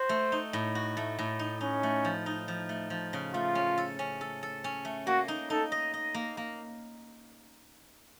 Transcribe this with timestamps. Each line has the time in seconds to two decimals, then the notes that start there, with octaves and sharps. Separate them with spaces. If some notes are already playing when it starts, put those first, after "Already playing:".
Already playing: F#4 C5
0.09 A3
0.32 D#4
0.53 A2
0.75 F#4
0.97 A3
1.19 A2
1.39 D#4
1.61 C#4 D#4
1.83 A3
2.05 F3
2.26 D#4
2.48 F3
2.69 A3
2.90 F3
3.13 C#3
3.34 A3 F4
3.55 C#4
3.78 A4
3.99 C#4
4.21 A4
4.43 A4
4.64 C#4
4.85 A3
5.07 A#3 F#4
5.28 D#4
5.50 D#4 A4
5.72 D#5
5.94 D#5
6.14 A#3
6.37 A#3